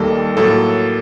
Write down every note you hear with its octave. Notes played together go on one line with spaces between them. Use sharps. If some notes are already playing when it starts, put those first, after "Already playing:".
Already playing: D#2 D#3 G3 A#3 A4
A2 F#3 A#3 A4